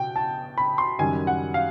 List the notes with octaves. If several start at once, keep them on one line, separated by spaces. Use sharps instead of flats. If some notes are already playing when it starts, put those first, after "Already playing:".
Already playing: B2 G5
A5
B5
C6
F#2 D#3 G3 G#5
F#5
F5